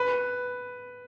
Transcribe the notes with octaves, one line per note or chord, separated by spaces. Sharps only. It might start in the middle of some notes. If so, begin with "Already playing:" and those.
Already playing: B4